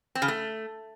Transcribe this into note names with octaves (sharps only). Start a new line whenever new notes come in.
C4
C#3
A3